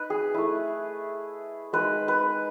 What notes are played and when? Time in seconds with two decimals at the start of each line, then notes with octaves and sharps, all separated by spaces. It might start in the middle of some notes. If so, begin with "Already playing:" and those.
Already playing: D#4 B4
0.10 G#4
0.34 A3 E4
1.73 G#3 D#4 B4
2.08 B4